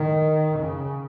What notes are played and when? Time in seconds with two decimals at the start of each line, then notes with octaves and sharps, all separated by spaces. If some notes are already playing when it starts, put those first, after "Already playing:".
Already playing: D#3
0.59 C#3